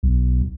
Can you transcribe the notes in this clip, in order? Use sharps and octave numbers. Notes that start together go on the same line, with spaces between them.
B1